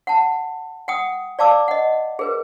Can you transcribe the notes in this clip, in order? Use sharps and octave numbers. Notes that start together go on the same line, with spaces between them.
F#5 A5
F#5 G5 D#6
D5 F5 A5 D6 E6
D#5 F#5
G#4 A#4 B4